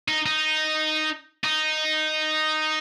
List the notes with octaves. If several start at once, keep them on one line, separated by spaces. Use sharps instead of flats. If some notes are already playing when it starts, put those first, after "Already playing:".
D#4
D#4
D#4